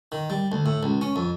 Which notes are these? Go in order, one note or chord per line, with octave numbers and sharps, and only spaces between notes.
D#3
G3
D2
A2
C#2
C#4
F2